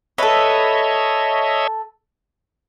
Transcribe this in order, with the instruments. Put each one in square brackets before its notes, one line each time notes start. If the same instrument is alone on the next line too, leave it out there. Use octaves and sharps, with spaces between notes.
[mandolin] A4 B4 [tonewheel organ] C#5 D#5 E5